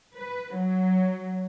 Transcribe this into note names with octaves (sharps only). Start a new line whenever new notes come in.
B4
F#3